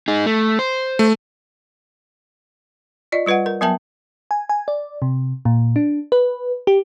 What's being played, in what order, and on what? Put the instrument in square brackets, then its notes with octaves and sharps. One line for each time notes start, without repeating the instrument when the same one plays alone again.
[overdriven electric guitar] D#4 G#4
A3
C5
[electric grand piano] A3
[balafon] F4 D5 D#5
G3 F4 B4 D#5 F#5
A#4
F#3 B3 A#4 E5 G5 A5
[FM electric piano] G#5
G#5
D5
C3
A#2
D4
B4
G4